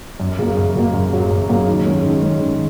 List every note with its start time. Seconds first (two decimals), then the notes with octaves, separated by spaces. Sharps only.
0.20 F#2
0.39 C#3 F#3 A#3
0.57 F#2
0.75 C#3 F#3 A#3
0.94 F#2
1.12 C#3 F#3 A#3
1.31 F#2
1.49 C#3 F#3 A#3
1.68 D#3
1.86 G#3 C#4
2.05 D#3
2.22 G#3 C#4
2.41 D#3